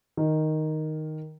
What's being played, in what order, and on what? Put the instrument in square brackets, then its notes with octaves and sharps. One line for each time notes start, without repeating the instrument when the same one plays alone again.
[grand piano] D#3